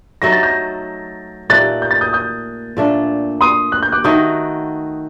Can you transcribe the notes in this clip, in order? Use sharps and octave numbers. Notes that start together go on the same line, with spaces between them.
F#3 A3 D#4 A4 A#6
A6
G6 A#6
A#2 A3 D#4 G4 F#6 A6
G6
A6
D#6 G6
D#6 G6
A#2 A3 D4 A4
C6 D#6
F#6
G6
D6 F#6
D#3 A3 D#4 F#4 D#6 G6